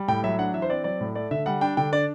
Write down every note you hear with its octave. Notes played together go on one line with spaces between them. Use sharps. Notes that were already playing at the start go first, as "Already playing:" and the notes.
Already playing: G3
A2 G5
F#3 E5
D4 F#5
E3 E5
C5
C4 D5
F#3 D5
A2
A3 D5
D3 E5
G3 F#5
D4 G5
D3 G5
D4 D5